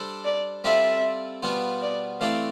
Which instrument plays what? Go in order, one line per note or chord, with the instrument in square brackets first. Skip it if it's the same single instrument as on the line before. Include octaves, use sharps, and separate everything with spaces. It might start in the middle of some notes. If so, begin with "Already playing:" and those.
Already playing: [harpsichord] G3 D4 A4 C5
[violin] D5
[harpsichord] G3 C4 F4 A4 D5 [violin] E5
[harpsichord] B2 G3 B3 F4 C5
[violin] D5
[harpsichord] E3 A3 C4 G4 D5 [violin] F5